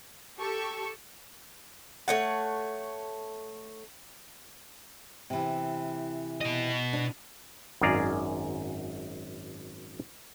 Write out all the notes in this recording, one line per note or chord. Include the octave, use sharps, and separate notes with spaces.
G4 A4 C#6
A3 C#5 F#5
C3 E3
B2 D#5
D4
G#1 F#2 G#4 D5 F5 A#5